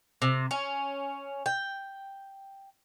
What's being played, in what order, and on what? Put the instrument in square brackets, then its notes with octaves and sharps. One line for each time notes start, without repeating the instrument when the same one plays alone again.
[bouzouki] C3
C#4
G5